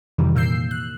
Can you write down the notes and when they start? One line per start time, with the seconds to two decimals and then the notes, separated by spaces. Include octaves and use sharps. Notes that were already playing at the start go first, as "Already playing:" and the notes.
0.18 F2 C3 D#3 E3 G3
0.35 A#2 A#3 E6 G6 C7
0.71 F#6